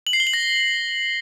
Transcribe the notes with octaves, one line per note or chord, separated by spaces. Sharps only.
F#7
C7
G7
F#7
A#6